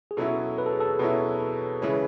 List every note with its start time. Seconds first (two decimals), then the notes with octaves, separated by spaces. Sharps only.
0.11 G#4
0.17 B2 F#3 C#4 E4 A4
0.58 B4
0.66 A4
0.73 G#4
0.80 A4
0.99 B2 F#3 C#4 E4 B4
1.34 B4
1.40 A4
1.82 C#3 E3 G#3 C#4 B4